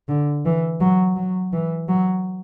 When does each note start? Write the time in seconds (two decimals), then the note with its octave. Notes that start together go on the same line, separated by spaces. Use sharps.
0.08 D3
0.45 E3
0.80 F#3
1.16 F#3
1.52 E3
1.88 F#3